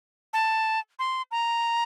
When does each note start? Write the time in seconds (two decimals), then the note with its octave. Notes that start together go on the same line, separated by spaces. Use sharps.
0.33 A5
0.99 C6
1.31 A#5